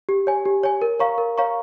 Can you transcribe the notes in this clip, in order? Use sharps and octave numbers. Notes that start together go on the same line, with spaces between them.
G4
C#5 G#5
G4
C#5 G#5
A#4
C#5 F5 A#5 C#6
A#4
C#5 F5 A#5 C#6